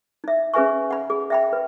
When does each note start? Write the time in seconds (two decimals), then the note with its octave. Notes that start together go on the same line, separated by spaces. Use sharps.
0.24 D#4 E5
0.54 C#4 G#4 B4 E5 G#5 C#6
0.91 F#5 B5
1.10 G#4
1.30 E5 G5 B5
1.53 B4